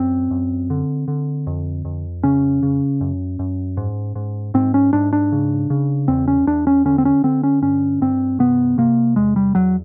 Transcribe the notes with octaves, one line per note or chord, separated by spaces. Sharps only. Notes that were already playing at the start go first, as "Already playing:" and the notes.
Already playing: F#2 C4
F#2
D3
D3
F2
F2
C#3 C#4
C#3
F#2
F#2
G#2
G#2
G#2 C4
C#4
G#2 D4
D4
C#3
C#3
E2 C4
C#4
E2 D4
C#4
D3 C#4
C4
C#4
D3 C4
C#4
G2 C#4
G2 C4
C3 B3
C3 A#3
E2 G#3
G3
E2 F#3